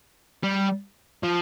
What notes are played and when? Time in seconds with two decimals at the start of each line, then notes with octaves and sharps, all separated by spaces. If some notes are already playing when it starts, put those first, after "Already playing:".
0.43 G3
1.23 F3